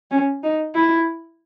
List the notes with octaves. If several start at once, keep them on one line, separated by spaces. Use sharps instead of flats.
C#4
D#4
E4